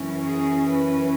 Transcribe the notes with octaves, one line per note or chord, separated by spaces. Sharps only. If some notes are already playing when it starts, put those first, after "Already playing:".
Already playing: F#2 E3 C#4
G#4
B4